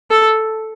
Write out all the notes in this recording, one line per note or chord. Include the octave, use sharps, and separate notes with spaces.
A4